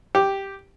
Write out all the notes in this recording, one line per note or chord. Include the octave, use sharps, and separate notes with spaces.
G4